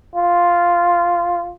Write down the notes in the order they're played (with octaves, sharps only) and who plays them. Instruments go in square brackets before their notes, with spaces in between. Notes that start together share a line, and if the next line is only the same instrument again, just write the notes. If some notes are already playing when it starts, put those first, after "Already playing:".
[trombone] F4